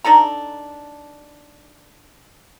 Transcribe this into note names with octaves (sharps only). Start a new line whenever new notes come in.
D4 D#4 A4 A#5